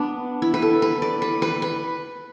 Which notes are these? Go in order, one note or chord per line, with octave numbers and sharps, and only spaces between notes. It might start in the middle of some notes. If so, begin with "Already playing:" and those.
Already playing: B3 D4
E4
B4
A4
B4
D5
B4
B4
B4